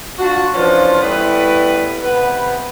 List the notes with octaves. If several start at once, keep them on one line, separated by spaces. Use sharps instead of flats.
D4 F4 F#4
E3 F3 C#4 D4 F4
A2 G3 B3 E4 B4
C3 B3 B4